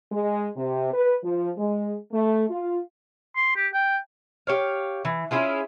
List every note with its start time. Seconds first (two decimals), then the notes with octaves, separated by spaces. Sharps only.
0.12 G#3
0.56 C3
0.93 B4
1.24 F3
1.58 G#3
2.12 A3
2.50 F4
3.36 C6
3.56 G4
3.73 G5
4.47 G4 C#5 F5
5.05 E3
5.31 C#4 E4 F4 G#4